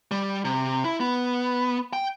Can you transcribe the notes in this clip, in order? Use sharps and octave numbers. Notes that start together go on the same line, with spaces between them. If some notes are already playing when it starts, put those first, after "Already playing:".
G3
C3
E4
B3
G5